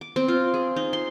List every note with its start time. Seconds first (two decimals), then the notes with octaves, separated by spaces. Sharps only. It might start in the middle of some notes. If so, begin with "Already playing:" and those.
0.01 D6
0.16 C4
0.28 F4
0.54 G#4
0.76 D#4
0.93 C6